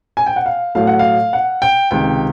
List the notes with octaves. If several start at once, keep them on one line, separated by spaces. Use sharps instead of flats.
G#5
G5
F#5
F5
A2 F#3 A3 F5
F#5
F5
F#5
G5
C#2 C3 D#3 G5